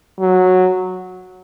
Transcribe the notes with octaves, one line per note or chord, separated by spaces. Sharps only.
F#3